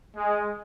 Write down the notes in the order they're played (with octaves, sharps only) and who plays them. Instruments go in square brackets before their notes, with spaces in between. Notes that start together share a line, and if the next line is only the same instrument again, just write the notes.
[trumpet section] G#3